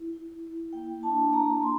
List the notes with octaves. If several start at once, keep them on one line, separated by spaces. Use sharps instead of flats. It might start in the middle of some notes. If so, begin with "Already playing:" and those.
Already playing: E4
E4
E4
A#3 G5
D4 A5
A#3 A#5
F4 C6